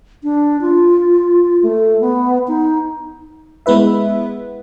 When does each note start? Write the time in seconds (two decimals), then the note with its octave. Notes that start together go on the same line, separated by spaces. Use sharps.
0.23 D4
0.61 F4
1.63 A3
2.01 B3
2.48 D#4
3.66 G#3 B3 E4 B4 E5